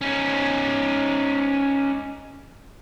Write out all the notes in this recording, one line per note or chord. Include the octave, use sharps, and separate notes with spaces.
C#4 D#4